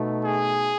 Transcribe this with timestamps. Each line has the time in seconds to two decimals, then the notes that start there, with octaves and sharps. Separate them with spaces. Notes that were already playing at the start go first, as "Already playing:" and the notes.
Already playing: B2 A3 D#4
0.25 G#4